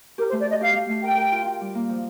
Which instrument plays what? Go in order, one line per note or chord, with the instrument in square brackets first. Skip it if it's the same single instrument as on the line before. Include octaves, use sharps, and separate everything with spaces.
[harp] G4 [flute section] A#4
[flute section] C5
[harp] A3
[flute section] D5
[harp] G4 [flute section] D#5
[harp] G4 [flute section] F5
[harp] A3
A3
[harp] A#4 [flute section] G5
[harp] A#4
F4
F4
G3
A#3
F3